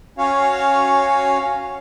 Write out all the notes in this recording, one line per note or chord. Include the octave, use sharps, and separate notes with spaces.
C#4 F#4 C#5 F5